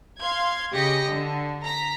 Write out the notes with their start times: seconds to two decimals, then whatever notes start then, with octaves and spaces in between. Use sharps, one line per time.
0.20 F5 C6 G#6
0.73 C#3 G4 D#5 A#6 B6 C#7
1.08 D3
1.63 A#5 B6